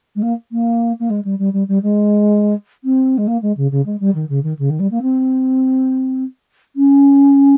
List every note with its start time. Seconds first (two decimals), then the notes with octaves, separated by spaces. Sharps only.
0.16 G#3
0.22 A#3
0.52 A#3
1.00 A#3
1.10 G#3
1.25 G3
1.39 G3
1.53 G3
1.68 G3
1.83 G#3
2.84 C4
3.18 G#3
3.27 A#3
3.42 G#3
3.57 C#3
3.71 C#3
3.86 G#3
4.00 G3
4.15 D#3
4.29 C#3
4.43 D#3
4.59 C#3
4.70 D#3
4.80 G3
4.91 A#3
5.02 C4
6.76 C#4